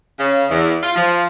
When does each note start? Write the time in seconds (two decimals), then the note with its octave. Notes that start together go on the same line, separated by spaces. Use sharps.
0.19 C#3
0.50 E2
0.82 F4
0.96 F3